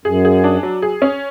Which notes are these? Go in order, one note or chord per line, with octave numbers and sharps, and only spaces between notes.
F#2 G#4
G#4
D4
F#3
G#4
C#4